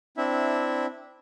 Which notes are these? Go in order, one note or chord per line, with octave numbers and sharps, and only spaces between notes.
C4 D4 E4 E5